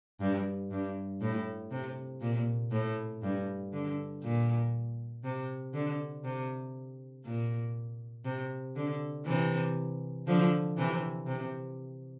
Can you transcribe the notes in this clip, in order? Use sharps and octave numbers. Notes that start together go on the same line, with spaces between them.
G2
G2
A2
C3
A#2
A2
G2
D3
A#2
C3
D3
C3
A#2
C3
D3
C3 E3
D3 F3
C3 E3
C3